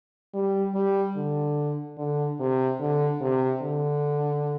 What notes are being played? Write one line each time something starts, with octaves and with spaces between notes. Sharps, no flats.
G3
G3
D3
D3
C3
D3
C3
D3